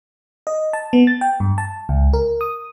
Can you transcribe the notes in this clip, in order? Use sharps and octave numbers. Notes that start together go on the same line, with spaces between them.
D#5
A5
B3
A6
G5
G2
A5
C#2
A#4
D#6